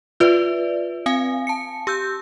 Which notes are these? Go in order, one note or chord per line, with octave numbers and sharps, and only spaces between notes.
F4 B4 D5 E5
C4 F5 G#5
A5 C#7
G4 E6 G6